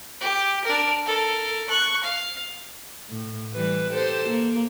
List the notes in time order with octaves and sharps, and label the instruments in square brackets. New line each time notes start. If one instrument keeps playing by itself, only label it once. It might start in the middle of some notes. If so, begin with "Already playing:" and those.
[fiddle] G4
D4 A#4
A4 A#4
C#6 F#6
F5
[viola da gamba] A2
E3 G3 B4
G4 A4 C5
A#3